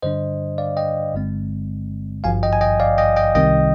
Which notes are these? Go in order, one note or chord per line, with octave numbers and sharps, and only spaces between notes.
G2 D3 G3 D4 C5 D#5
D5 F5
D#5 G5
G1 G2 D3 G#3 C4
G#1 G2 F3 F5 G#5
D#5 G5
G#5
D#5 G5
D5 F5
D#5 G5
D#5 G5
C2 C3 D#3 G3 C4 D#5 G5